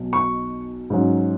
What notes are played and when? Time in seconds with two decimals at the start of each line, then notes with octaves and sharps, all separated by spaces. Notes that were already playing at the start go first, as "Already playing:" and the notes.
Already playing: B1 B2 F#3
0.13 C#6
0.90 G#2 F#3 C#4